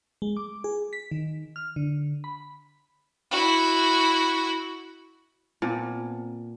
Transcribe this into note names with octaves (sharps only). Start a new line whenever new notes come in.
G#3
D6
G#4
B6
D#3
F6
D3
B5
E4 F#4
A#2 B3 C4 A5